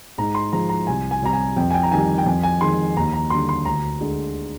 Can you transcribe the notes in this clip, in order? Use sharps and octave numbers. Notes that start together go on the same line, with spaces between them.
G#2 A#5
C6
F3 G#3 A#5
A#5
C2 G#5
G#5
C3 G3 A#5
G#5
F2 G5
G#5
G5
A#5
D#3 G3 G#5
G5
F2 G#5
G#5
D#3 G#3 C6
D#2 A#5
A#5
D3 G3 C6
C6
D2 A#5
D3 G#3